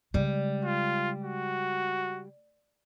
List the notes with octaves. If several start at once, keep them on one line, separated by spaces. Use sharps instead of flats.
C#3 G3 G#3
F4
F#4